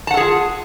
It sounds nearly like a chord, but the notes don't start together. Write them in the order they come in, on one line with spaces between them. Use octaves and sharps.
A5 F#5 A4 G#4 F4